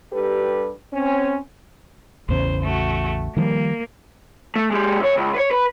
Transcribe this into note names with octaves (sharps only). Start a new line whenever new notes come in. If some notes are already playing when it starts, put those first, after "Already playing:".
G2 G3 G4 A4 B4
C4 C#4
A1 E2 C#3 C5
A3 F#4
D#3 F3 G3 A#3
A3
G#3 G4
F#2 C#5
C#2
B4 C#5
B4